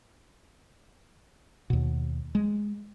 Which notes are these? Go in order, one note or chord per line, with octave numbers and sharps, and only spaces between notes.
D#2 B2
G#3